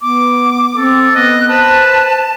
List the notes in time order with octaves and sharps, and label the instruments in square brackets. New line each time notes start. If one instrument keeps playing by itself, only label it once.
[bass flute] B3 [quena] D6
[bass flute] C4 [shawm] A4
[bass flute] B3 [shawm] D#5 [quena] F#6
[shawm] B4 [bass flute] C5 [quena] A5